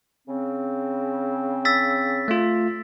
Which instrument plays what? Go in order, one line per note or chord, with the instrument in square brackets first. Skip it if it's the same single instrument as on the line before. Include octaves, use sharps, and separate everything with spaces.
[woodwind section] C#3 C4
[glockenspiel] E6 A6 B6
[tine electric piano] A3 F4